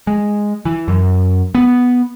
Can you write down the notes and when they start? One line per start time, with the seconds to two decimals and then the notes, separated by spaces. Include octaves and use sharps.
0.07 G#3
0.65 E3
0.88 F#2
1.55 B3